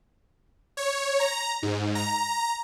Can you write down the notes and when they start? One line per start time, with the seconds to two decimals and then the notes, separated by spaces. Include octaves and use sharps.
0.77 C#5
1.20 A#5
1.63 G#2
1.95 A#5